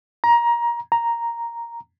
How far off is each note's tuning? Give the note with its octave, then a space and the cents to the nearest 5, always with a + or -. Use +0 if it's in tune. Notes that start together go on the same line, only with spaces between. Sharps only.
A#5 +20
A#5 +0